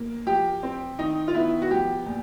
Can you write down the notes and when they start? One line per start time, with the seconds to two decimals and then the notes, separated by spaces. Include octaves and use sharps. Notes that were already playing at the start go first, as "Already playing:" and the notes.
Already playing: A#3
0.26 F3 G4
0.63 C4
0.99 D#3 D#4
1.28 F4
1.35 B3 E4
1.62 F#4
1.71 F3 G4
2.06 A#2